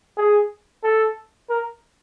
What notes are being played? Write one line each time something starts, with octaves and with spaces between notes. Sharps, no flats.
G#4
A4
A#4